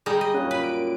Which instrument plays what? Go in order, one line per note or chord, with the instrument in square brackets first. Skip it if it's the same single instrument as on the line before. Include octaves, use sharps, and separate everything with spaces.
[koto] G3 D#4 [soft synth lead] G#4
[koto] D#5
[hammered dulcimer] F#2 A#2 F#5 [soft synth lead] C#4
[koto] B4
[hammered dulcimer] D4 [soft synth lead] D7